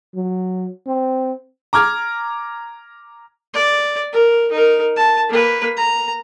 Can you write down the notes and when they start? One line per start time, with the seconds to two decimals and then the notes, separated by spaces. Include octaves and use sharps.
0.15 F#3
0.87 C4
1.73 A#5 D6 F6 G#6
3.54 D5
4.13 A#4
4.52 D#4 A#4
4.97 A5
5.29 A#3 B4
5.77 A#5